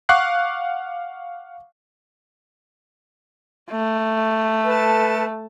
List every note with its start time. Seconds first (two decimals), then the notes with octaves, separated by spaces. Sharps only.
0.09 F5 F#5 C#6 D6 F#6 C7
3.71 A3
4.65 A4 B4 A5